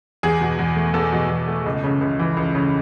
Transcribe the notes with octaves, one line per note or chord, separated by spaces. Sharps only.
E2 G#4
B2
E2
A3
E2 A4
B2
E2
A3
C#2
C#3
C#2
E3
C#2
C#3